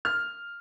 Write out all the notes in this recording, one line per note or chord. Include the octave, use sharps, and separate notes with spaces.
F6